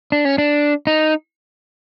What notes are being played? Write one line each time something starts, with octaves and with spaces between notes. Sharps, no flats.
D4
C#4
D4
D#4